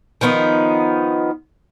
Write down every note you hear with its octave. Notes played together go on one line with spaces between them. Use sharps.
D#3 F3 B3 D#4